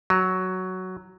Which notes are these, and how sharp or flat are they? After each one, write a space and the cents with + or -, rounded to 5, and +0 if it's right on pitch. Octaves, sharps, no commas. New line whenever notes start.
F#3 +5